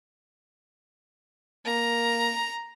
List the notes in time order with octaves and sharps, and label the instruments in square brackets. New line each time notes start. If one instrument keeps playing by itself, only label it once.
[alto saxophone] A#3 [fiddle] A#5